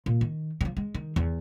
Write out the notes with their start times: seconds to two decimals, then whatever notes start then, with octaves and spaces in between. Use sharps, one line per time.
0.06 A#2
0.21 D#3
0.61 D3 F3
0.77 G#3
0.95 D#3
1.16 E2